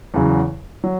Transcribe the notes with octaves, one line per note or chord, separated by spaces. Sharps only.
E2 C#3 F#3
F#3